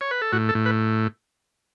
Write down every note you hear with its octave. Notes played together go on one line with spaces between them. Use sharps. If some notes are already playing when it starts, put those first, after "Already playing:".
C#5
B4
A4
A2 F#4
A4
A2
B4